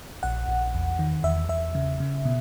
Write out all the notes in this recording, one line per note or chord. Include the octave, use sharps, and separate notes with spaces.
A#1 F#5
A#1
E2
D#3
E2 E5
E2 E5
C#3
C#3
B2